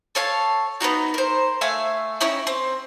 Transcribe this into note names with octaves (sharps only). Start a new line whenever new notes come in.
A4 C#5 F5 A5
B3 C#4 D#4 F#4
A#4 C5
A3 E5 F5 G#5
C#4 D#4 E4 G5
C4